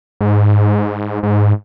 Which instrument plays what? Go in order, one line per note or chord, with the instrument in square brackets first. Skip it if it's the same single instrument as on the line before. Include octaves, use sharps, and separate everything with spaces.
[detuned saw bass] G#2
G#2